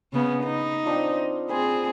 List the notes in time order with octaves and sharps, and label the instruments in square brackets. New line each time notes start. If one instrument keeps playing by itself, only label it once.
[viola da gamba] C#3 B3 C#4
[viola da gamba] D#4 [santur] B4
[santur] C4 D4 F4
[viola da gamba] C4 G#4 [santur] B4 G#5 C6